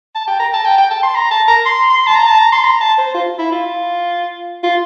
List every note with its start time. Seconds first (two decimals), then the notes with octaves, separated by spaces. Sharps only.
0.15 A5
0.28 G5
0.40 A#5
0.53 A5
0.65 G5
0.78 G5
0.91 A5
1.03 C6
1.15 A#5
1.31 A5
1.48 A#5
1.65 C6
1.90 C6
2.07 A5
2.15 A#5
2.27 A5
2.39 A#5
2.52 C6
2.64 A#5
2.81 A5
2.98 C5
3.14 F4
3.39 E4
3.52 F4
4.64 F4